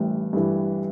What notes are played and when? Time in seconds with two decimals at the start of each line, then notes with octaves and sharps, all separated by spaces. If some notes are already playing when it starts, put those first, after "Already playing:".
Already playing: A1 G2 E3
0.33 G2 E3